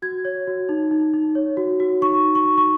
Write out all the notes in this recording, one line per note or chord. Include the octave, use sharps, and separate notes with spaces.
F#4 G#6
C#5
F#4
D#4
D#4
D#4
C#5
F#4
F#4
D#4 C#6
D#4
C#6
D#4
C#6